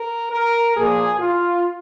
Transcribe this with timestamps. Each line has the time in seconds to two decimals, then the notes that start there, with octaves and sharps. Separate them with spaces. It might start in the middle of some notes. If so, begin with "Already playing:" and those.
Already playing: A#4
0.31 A#4
0.75 A#2 F3 A#3 G#4
1.18 F4